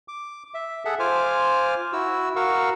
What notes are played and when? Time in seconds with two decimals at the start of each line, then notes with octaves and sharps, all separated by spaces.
0.08 D6
0.54 E5
0.85 G#4 A4 E5 F#5
0.99 F4 C5 G#5 D6 F6
1.93 E4 F#4 E6
2.36 F#4 A#4 F5 F#5 C#6 E6